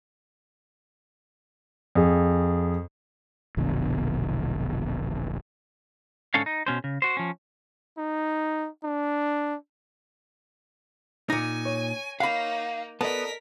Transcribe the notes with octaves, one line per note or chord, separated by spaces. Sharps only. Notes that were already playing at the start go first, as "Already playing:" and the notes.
F2 G#4
E1 A#1 B2 D3
G#2 D3 C#4 A4 C#5 F5
D#4
B2 C#4 C5
C#3
F#4 C5
F3 C#4
D#4
D4
A#2 D#4 G#5 A#6 C#7
C#5
A#3 D#4 F5 F#5 B5
B3 A4 A#4 D5 D#5 A5 B6